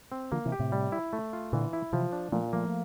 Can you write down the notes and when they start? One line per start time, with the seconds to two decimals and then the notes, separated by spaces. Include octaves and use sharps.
0.12 C4
0.32 D3 F3 A#3
0.45 C3 E3
0.52 G4
0.59 A2 C3
0.72 G3
0.92 E4
1.13 A3
1.33 F4
1.53 A#2 D3 E3
1.73 E4
1.93 C3 E3 F3
2.12 D4
2.32 A#2 F3 A3
2.53 F3 A3 A#3